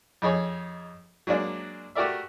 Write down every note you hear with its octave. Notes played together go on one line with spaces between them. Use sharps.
F2 D#4 G#4 C#5
F#3 G#3 A#3 D4 G#4
A3 F#4 G4 A#4 D5 E5